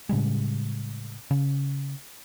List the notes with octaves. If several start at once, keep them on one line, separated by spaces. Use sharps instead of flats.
A2 C#3 G3 G#3
C#3